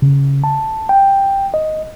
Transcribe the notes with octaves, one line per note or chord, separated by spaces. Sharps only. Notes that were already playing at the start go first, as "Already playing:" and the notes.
C#3
A5
G5
D#5